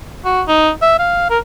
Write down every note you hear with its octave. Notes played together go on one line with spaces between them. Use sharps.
F#4
D#4
E5
F5
A#4